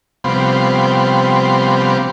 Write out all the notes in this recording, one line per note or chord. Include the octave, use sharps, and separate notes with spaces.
C3 F3 G3 B3 C4